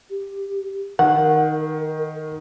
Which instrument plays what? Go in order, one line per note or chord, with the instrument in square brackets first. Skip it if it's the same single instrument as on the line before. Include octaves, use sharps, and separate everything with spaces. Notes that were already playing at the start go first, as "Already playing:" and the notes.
[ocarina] G4
[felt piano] D#3 [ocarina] A#4 [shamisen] F#5